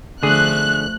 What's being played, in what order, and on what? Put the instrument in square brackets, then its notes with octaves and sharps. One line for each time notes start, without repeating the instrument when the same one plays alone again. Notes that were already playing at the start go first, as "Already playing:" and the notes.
[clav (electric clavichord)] D3 G#4 [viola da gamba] F3 A3 [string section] F#6